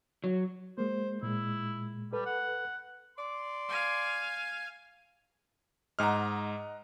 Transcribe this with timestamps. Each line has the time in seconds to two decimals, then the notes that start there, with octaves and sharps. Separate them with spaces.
0.24 F#3
0.78 G#3 A#3 C5
1.23 A#2 G#3 E4
2.13 G3 A4 B4
2.25 F#5
3.18 D5 C6
3.69 F5 G#5
5.99 G#2 D#5 F#5 A#5 F6